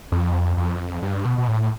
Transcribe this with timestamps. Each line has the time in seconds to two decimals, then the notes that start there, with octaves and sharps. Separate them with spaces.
0.12 F2
0.57 F2
1.02 G2
1.25 B2
1.38 B2
1.48 A2